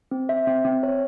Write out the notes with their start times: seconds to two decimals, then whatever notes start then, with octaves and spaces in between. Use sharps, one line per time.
0.11 C4
0.29 E5
0.47 C4
0.65 C4
0.83 C#5